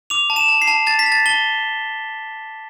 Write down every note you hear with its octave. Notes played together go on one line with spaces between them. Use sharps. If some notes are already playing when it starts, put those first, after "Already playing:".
D6 F7
A5
E7
A5
C7
A5
A5 A6
B6
A5
A6
A5 G7